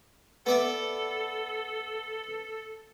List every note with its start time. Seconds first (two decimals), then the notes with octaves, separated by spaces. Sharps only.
0.46 B3 A4 D5 E5